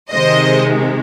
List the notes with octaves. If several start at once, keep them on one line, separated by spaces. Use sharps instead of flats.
C3 D#3 G#3 C5 D#5